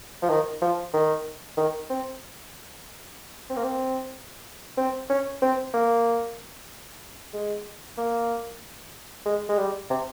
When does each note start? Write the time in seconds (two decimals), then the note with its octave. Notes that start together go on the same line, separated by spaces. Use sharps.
0.22 F3
0.30 D#3
0.62 F3
0.93 D#3
1.58 D#3
1.90 C4
3.50 C4
3.56 A#3
3.64 C4
4.78 C4
5.10 C#4
5.42 C4
5.74 A#3
7.34 G#3
7.98 A#3
9.26 G#3
9.49 G#3
9.58 G3
9.90 C3